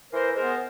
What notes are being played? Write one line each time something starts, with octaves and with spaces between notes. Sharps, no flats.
E3 A#4 C5
G#3 B3 A#4 C5